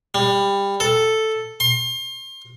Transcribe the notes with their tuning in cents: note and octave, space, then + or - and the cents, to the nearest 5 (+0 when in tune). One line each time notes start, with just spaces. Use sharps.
G3 +20
A4 +0
C6 +30